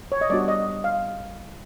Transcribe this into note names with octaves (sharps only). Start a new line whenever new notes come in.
C#5
D#5
G3 B3 D4 F#4 D5
D#5
F5